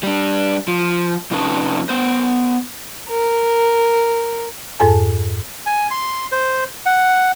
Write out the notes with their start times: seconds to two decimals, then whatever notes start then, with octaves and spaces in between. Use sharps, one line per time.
0.03 G3 D4
0.68 F3
1.31 F2 C3 C#4 D#4 B4 A5
1.89 B3 C5
3.09 A#4
4.80 F2 G#2 A4 G#5 A5
5.66 G#5
5.91 C6
6.32 C5
6.86 F#5